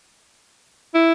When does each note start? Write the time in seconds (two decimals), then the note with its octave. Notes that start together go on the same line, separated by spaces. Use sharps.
0.95 E4